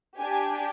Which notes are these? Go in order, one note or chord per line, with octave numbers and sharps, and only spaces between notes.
D4 G4 G#5